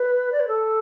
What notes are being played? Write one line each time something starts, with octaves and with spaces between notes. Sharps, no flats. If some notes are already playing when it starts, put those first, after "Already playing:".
Already playing: B4
D5
B4
A4